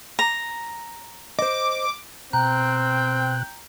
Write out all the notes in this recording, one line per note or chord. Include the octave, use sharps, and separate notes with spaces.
A#5
C5 D#5 D6
B2 C4 G5 A#5 F#6